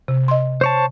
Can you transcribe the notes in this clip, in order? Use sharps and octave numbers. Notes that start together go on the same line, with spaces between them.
C3
D#5 C6
C5 C#5 A5